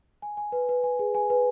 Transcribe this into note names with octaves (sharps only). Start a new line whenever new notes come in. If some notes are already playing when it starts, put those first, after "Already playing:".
G#5
G#5
B4
B4
G#5
G#4
G#5
B4